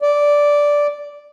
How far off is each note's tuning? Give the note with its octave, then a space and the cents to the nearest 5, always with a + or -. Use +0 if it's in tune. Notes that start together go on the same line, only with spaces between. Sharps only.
D5 -5